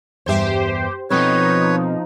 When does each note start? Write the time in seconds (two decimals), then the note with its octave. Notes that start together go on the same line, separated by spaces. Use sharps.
0.26 E2 G2 G4 C5 E5
1.10 B2 F3 C4 D#4 A4 B4 C#5